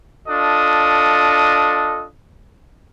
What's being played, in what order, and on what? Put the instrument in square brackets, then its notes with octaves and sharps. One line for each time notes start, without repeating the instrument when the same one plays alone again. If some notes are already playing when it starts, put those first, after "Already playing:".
[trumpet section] D4 F4 A4 D#5